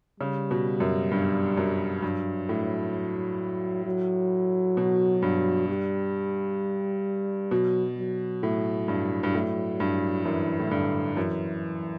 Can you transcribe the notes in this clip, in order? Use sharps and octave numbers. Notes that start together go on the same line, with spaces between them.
C#3 G3
B2
F#2
G2
F#2
G2 F#3
A2
F#3
B2
G2
G3
B2 F#3
F#3
A2
G2
G2
A2
G2
F#2 E3
A2
G2 D3
F#2 E3